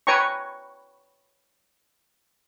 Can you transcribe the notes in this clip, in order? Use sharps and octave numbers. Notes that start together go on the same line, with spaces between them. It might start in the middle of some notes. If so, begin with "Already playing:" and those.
B4 C#5 G5 G#5 A#5 C#6